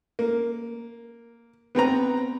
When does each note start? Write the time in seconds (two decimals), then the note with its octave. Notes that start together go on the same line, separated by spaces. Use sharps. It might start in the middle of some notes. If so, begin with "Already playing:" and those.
0.19 A#3
1.75 B3 C4 B4 A#5